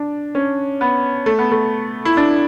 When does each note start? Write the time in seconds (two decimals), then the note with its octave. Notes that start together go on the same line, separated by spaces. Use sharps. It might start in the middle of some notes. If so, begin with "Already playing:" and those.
Already playing: D4
0.35 C#4
0.81 B3
1.26 A3
1.39 B3
1.52 A3
2.05 E4
2.17 D4